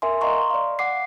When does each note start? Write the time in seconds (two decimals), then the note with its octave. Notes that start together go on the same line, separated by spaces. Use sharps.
0.02 A#4 E5 G#5 C6
0.21 D#5 F5 A#5 C6 C#6
0.50 D5 F5
0.79 F#5 D6 C7